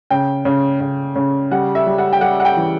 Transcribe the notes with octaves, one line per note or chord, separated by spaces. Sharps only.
C#3 G5
C#3
C#3
C#3
G3 F#5
E5
G3
F#5
G5
G3 F#5
F#5
G5
E3